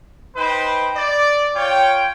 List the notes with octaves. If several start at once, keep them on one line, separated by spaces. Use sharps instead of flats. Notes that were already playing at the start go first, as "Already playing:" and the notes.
D#4 B4 C5 G5
D5
F4 C#5 G5